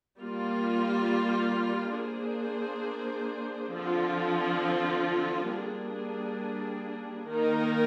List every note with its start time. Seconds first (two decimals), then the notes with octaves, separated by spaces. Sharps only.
0.18 G3 A#3 F4
1.96 A#3 D4 G#4 C5
3.73 D3 F3 C4 F4
5.51 G3 A#3 D4 G#4
7.29 D#3 A#3 D#4 A#4